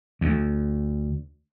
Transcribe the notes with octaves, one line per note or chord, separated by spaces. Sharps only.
D2